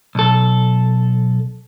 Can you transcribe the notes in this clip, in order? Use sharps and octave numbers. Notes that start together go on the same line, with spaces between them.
B1 A4